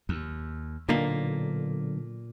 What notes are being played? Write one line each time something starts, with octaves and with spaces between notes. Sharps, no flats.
D#2
B1 A#2 D3 A#3